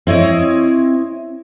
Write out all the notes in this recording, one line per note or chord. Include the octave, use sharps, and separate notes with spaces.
C4 E4 C#5 D#5